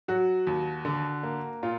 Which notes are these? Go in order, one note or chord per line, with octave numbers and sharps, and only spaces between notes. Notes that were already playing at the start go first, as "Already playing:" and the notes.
F#3 F#4
D#2
D3
A#3
A#2 F4